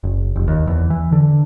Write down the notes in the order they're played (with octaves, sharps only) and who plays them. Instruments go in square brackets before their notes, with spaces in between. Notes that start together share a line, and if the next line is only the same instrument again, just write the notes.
[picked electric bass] F#1
F1
D#2
E2
E3
D3